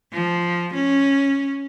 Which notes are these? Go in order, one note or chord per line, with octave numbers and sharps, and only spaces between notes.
F3
C#4